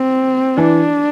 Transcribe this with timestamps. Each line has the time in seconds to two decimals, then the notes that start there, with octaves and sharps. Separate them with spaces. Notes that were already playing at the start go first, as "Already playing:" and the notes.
Already playing: C4
0.57 E3 D4